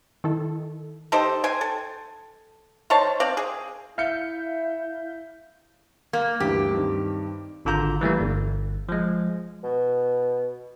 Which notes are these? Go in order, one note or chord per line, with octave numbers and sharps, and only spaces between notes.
D#3 E4 A4
D#4 G4 A4 C5
C5 G5 G#5
A4
D#3 C5 C#5 A5
C4 D5 F5
G#4
E4 E5 F5 G6 C#7
A#3
D2 G2 E3 G4
G2 D#3 C4
G#1 D3 F4 A#5 G6
E3 G3 A3 A#3
G1
F3 G#3
B2